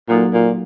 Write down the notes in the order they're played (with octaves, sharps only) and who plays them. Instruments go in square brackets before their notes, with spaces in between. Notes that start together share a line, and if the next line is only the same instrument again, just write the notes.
[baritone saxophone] A#2 [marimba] F#3 A#3 D#4 F#4 A4
[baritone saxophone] A#2